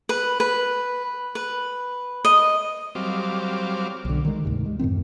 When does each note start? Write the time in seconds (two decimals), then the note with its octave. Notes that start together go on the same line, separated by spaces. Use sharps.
0.09 B4
0.40 B4
1.35 B4
2.25 D#5
2.95 F#3 G3 C4 F5 D6
4.05 B1 D3
4.25 D#3 G#3
4.45 D2 G#2 C3
4.66 G#3
4.79 F#2 A2 D#3 C4